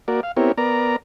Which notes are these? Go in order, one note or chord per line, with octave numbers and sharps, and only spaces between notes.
A#3 F#4 A#4 D5
F5
B3 C4 E4 G4 A#4 C#5
B3 A#4 D5 A#5